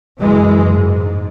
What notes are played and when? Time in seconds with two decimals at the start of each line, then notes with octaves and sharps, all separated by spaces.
0.21 F#1 E3 G#3
0.72 G#2